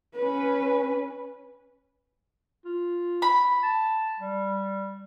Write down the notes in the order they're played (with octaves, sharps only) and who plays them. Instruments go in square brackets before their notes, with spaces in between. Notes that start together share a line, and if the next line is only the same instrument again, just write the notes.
[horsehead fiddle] C#4 B4
[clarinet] F4
[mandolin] B5
[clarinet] A5
G3